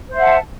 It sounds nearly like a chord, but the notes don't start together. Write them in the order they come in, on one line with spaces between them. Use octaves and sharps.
C5 E5 F#5 A5